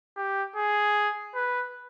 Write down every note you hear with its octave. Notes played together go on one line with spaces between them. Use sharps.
G4
G#4
B4